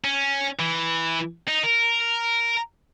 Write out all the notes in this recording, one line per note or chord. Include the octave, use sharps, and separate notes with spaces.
C#4
E3
D#4
A#4